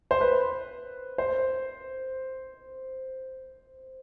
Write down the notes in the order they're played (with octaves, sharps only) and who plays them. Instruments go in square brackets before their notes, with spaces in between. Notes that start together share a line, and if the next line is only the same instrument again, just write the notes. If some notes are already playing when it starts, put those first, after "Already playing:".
[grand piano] C5
B4
C5